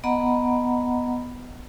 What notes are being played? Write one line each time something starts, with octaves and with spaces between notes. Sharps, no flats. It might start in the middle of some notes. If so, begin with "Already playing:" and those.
B3 D#5 F#5 A#5 B5